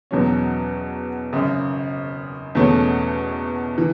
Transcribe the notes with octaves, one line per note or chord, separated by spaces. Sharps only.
E2 B2 F#3 C#4
G#1 F#2 C#3
E2 B2 A3 C#4
E3